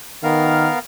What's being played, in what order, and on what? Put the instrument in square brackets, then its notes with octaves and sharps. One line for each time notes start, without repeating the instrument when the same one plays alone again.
[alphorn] D#3 [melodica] B3 A#4 F5